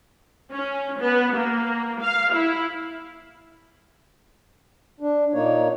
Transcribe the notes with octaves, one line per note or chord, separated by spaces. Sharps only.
C#4
B3
A#3
F5
E4
D4
A#2 A#3 D#4 C#5